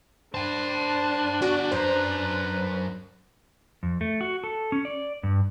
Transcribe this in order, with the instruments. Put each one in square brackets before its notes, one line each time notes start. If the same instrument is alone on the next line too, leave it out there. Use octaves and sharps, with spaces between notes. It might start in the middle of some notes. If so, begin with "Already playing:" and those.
[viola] D4 [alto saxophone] C5 [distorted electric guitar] G5 A5
[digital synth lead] F#4 [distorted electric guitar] G#4 D5
[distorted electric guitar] F#2 A#5 [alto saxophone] B4 [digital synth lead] C5
[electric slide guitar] F2
A3
F#4
A4
C#4
D5
G2